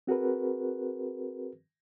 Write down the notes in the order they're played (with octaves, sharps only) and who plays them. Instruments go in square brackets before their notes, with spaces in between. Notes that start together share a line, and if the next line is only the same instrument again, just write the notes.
[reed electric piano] C4 F#4 G#4 A#4 B4